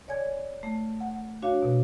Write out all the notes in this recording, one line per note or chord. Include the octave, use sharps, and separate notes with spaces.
C#5 D5 G#5 G#6
A3
F#5
D4 F#4 C#5 F5
B2